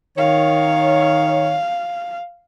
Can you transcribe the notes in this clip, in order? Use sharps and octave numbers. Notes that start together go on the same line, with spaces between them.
D#3 C#5 F5